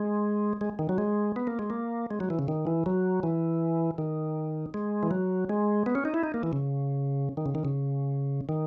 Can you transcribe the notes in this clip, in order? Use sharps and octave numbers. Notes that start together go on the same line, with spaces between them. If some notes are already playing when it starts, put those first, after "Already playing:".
Already playing: G#3
G#3
D#3
F#3
G#3
B3
A#3
G#3
A#3
G#3
F#3
E3
C#3
D#3
E3
F#3
E3
D#3
G#3
E3
F#3
G#3
B3
C#4
D#4
E4
D#4
A#3
E3
C#3
D#3
C#3
D#3
C#3
D#3